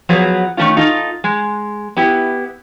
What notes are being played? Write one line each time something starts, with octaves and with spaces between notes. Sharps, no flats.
F3 F#3 B3 G#4
D#3 A3 C#4 F4
D#4 F4 A4
G#3
B3 E4 G4